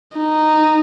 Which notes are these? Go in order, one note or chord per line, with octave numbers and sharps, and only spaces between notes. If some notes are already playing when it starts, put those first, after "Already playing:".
D#4